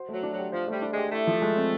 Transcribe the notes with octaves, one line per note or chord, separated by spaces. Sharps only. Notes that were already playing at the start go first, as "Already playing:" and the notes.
Already playing: F#4 C5
F#3 A3
D4
F#3
G4
F3 C5
G3 A3
D4
G#3 G4
A3 E4
F3
G#3
C4